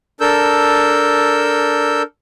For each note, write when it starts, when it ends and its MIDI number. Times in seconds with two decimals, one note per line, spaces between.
0.20 2.02 62
0.20 2.02 69
0.20 2.02 70
0.20 2.02 88
0.20 2.02 91